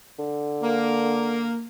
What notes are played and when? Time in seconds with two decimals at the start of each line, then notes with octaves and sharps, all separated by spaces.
0.19 D3
0.63 A#3